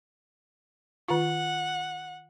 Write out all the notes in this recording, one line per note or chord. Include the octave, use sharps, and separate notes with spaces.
D#3 F4 F#5